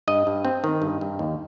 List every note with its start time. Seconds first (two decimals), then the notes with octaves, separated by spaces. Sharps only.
0.08 G2 D#5
0.27 G2
0.45 C4
0.64 D#3
0.82 G2
1.01 G2
1.19 D#2